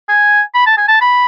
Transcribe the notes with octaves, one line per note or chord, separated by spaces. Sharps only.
G#5
B5
A5
G#5
A5
B5